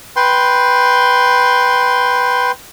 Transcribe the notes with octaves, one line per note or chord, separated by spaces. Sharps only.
B4 G5 C6